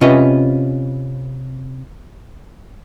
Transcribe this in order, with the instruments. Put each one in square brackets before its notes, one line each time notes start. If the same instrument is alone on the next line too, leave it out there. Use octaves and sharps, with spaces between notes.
[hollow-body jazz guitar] C3 C#4 F4 B4 D#5